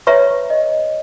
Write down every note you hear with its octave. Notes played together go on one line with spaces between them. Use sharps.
B4 C#5 E5 A#5 C#6
D#5